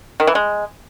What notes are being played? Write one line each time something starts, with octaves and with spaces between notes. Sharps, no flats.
D#3
E3
G#3